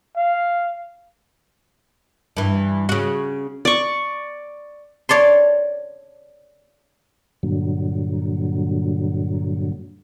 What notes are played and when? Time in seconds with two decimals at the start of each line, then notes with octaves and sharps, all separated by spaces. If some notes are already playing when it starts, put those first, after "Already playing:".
0.17 F5
2.37 G2 E3
2.89 C#3 F#4
3.65 D5 C#6
5.09 C#5 D5 A5 C6
7.43 G2 A#2 D3 F#3